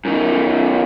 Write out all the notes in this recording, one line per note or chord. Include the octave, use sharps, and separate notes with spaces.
F#2 D#3